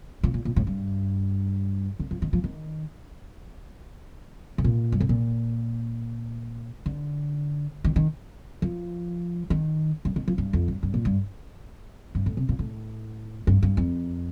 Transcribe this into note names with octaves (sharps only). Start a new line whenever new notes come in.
A#2
A#2
A#2
A2
G2
D3
F3
D#3
F3
D#3
A2
A#2
G2
A2
A#2
D3
D#3
D#3
F3
D#3
G2
D#3
F3
G2
F2
G2
G2
A#2
G2
G2
A2
C3
A#2
A2
G2
G2
F2